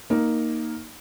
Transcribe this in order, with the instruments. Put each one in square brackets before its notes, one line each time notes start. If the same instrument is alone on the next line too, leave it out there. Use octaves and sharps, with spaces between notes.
[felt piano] A#3 D#4